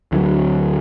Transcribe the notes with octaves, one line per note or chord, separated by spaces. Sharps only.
D2 D3 E3 F#3